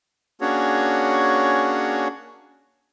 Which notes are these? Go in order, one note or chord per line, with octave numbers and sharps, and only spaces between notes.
A#3 C#4 D4 F#4 G#4 C#5